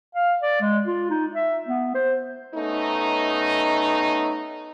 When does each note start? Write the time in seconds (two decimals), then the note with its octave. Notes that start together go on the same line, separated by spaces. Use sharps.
0.15 F5
0.42 D5
0.61 G#3
0.86 F4
1.10 D#4
1.34 E5
1.68 B3
1.95 C5
2.54 A3 B3 C#4 D#4